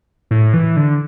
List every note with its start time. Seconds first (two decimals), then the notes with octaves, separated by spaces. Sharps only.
0.31 A2
0.54 E3
0.77 D3